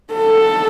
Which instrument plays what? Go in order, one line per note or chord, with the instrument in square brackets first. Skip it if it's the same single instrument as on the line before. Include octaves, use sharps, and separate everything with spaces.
[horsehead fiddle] A4